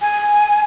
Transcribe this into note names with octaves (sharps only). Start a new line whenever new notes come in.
G#5